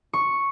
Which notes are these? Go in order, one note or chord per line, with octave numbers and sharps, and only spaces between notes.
C#6